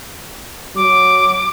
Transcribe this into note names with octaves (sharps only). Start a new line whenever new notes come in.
F#3 D6